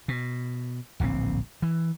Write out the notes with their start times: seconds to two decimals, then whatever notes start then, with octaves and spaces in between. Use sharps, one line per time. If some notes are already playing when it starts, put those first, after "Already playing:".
0.08 B2
1.00 D1 A#1 C3 C4
1.62 E3